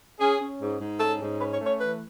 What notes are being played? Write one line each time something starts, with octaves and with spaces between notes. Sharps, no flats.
C#4 G#4
C#4
G#2
G#2
C#4 A4
G#2
C#4 B4
C#5
A3
C#5
E3 B4